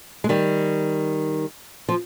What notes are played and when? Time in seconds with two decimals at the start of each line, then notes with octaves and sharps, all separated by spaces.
0.24 G#3
0.29 D#3 G3
1.89 F3